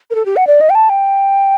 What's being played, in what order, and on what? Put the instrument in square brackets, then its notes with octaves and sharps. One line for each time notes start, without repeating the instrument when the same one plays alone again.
[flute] A#4
A4
G4
F#5
D5
D#5
G5
A5
G5